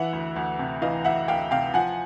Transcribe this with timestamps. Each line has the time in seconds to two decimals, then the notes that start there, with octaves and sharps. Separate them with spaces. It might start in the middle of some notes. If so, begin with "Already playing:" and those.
Already playing: E3 E5 F#5
0.13 D2
0.36 D2
0.59 C3
0.82 E3 D#5 F5
1.05 D2 E5 F#5
1.28 D2 F5 G5
1.51 C3 F5 G5
1.74 F3 F#5 G#5